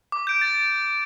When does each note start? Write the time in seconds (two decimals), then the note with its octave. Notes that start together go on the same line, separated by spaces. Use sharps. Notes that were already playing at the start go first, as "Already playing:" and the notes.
0.12 D6
0.27 G6 D7
0.41 A6